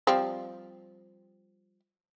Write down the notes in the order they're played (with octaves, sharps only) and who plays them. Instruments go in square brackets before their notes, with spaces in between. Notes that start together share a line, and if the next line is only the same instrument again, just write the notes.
[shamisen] F3 G3 C4